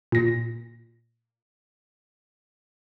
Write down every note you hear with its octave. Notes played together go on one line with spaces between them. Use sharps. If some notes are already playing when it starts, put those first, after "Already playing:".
A#2 A#6